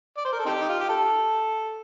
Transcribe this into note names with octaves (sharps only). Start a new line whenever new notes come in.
D5
C5
A#4
A4
C4 D#4 G4
D#4
F4
G4
A4